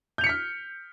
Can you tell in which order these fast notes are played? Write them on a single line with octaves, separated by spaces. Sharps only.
G6 F7 C#7 B6 F6